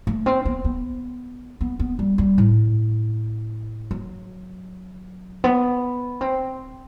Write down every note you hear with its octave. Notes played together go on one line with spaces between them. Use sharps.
A3
C4
B3
B3
B3
B3
G3
G3
A2
F#3
B3
C4